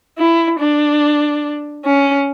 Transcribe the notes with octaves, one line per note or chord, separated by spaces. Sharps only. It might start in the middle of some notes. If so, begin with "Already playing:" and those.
E4
D4
C#4